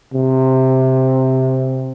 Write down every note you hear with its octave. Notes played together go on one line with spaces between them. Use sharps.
C3